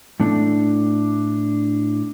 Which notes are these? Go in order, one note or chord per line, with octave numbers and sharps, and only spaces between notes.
A2 A3 D4